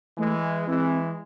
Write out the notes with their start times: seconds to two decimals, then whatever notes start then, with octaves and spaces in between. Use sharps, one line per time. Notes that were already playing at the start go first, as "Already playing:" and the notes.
0.18 E3 G#3 A3
0.67 E3 G#3 C4